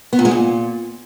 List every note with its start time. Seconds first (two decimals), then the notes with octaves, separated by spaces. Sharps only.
0.13 B3
0.19 A#2
0.25 G#3
0.31 A#2